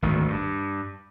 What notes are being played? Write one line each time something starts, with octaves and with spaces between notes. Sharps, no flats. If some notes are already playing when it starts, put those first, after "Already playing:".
G#1 D2 D#3
G2